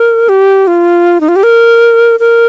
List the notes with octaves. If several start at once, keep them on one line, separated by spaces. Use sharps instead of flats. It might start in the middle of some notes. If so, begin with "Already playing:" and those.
Already playing: A#4
G4
F4
D#4
F4
G4
A#4
A#4